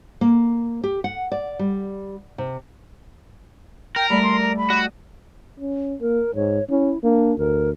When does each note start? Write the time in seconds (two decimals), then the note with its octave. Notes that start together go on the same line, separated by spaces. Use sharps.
0.21 A#3
0.84 G4
1.04 F#5
1.32 D5
1.59 G3
2.38 C3
3.96 A#4 G5
4.10 G3 A3 D5 B5
4.23 C6
4.42 A#5
4.57 B5
4.70 F#4 D#5
5.60 C#4
6.01 A#3 A#4
6.35 G#2 C#5
6.70 C#4 E4
7.04 A#3 D4
7.38 D2 A#4